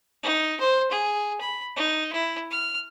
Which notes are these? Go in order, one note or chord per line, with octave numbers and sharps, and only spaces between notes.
D#4
C5
G#4
B5
D#4
E4
F6